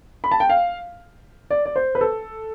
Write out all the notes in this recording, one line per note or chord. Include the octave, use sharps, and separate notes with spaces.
B5
A5
G5
F5
D5
D5
C5
B4
A4